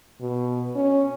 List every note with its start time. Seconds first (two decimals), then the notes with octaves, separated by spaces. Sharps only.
0.21 B2
0.76 C#4